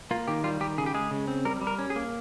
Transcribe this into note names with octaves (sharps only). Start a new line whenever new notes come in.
A#3 F4
D#3 G4
G3 F4
D#3 G4
C#3 G#4
G4
G#3 G#4
C#3
C4
G3 A#4
G3
A#4
C#4
G#4
A#3